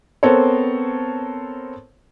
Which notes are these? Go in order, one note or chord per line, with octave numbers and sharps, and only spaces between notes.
B3 C4 A4 A#4 C5 C#5